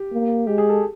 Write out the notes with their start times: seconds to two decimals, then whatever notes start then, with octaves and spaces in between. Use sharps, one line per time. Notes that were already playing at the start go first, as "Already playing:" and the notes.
Already playing: G4
0.13 A#3
0.47 G#3 G4
0.58 G#4
0.69 A4